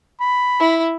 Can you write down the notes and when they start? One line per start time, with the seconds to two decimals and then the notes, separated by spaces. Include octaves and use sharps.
0.21 B5
0.60 E4